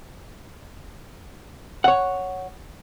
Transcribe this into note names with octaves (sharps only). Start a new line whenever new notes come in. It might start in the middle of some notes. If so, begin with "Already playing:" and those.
C#5 F#5